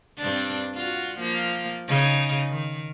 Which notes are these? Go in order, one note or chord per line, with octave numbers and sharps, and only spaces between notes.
G2 C4 D4
F4 F#4
F3 A#3
C#3 D#4
D#3